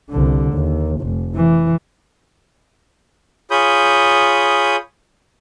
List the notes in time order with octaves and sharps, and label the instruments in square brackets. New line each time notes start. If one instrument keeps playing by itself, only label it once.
[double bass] C2 D3
D#2
F1
E3
[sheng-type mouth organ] F4 G#4 C#5 B5 D#6 G6